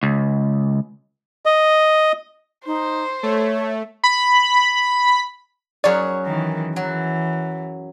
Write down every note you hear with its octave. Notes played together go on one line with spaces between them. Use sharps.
C#2
D#5
D#4 C5
A3 C#5
B5
F#2 G#4 C#5 D5
D#3 E3
E3 F#3